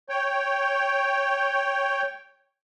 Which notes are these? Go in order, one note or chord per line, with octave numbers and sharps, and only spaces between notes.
C#5 G5